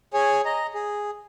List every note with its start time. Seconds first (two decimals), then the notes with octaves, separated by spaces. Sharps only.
0.14 G#4 C#5 G#5
0.45 D#5 A#5
0.74 G#4